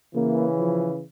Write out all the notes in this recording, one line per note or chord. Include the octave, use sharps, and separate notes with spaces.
C#3 E3 A#3
F3